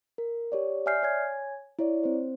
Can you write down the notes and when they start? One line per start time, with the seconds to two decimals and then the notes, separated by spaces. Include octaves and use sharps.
0.18 A#4
0.52 G4 C#5 D5
0.86 D5 E5 G#5 F6 G6 C7
1.03 C#5 G#5 G#6
1.79 E4 C#5 D5
2.04 C4 C5